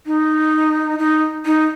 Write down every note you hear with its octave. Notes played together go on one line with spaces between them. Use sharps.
D#4
D#4
D#4